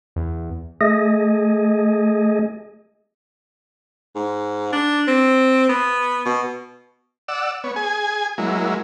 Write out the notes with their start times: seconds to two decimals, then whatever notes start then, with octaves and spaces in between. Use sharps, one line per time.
0.16 E2
0.81 A3 G#4 D#5
4.15 G#2
4.72 D4
5.08 C4
5.69 B3
6.25 B2
7.28 D5 F#5 E6
7.64 B3 C#5
7.76 G#4 G#5
8.38 F#3 G#3 A#3 E4